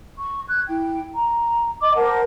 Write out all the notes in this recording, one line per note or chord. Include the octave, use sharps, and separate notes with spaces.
C#6
F#6 G#6
E4 G5
A#5
D#5 D6
A#4 C5 F#5 A5